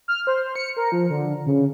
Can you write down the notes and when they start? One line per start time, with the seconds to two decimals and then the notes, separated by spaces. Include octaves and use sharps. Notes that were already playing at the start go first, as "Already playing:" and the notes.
0.08 F6
0.27 C5
0.55 C#7
0.77 A#4
0.92 F3
1.10 D3
1.46 C#3